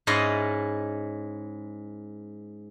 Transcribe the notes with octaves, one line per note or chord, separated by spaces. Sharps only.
G#2 C#4 E4 D5 D#5 F5